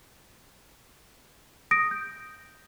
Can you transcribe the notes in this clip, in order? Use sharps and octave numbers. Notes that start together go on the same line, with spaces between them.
D#6 A#6 D7
G6